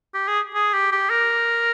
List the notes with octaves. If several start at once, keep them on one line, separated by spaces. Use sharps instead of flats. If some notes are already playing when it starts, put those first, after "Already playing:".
G4
G#4
G#4
G4
G4
A#4